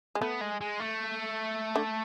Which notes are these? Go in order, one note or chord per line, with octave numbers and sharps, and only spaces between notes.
G#3
A3 B3
G#3
G#3
A3
D3